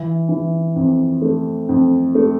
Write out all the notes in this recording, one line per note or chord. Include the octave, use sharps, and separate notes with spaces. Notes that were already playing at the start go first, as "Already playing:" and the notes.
Already playing: E3
E3
F2
A3
F2
A3